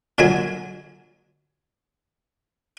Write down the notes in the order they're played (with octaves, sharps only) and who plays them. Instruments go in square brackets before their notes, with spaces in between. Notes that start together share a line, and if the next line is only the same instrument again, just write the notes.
[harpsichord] A#2 D3 F#3 G#3 G#5